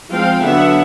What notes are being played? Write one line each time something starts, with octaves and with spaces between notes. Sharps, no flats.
F3 G#3 C4 F5 G5
D3 F#3 B3 D4 E5 F#5